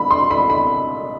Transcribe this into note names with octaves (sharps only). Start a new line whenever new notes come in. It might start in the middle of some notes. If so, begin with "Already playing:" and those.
Already playing: B5
C6
B5
B5